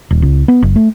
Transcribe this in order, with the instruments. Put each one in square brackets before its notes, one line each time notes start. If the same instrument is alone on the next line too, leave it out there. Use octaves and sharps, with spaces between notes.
[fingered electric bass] D#1
C#2
B3
F#1
A3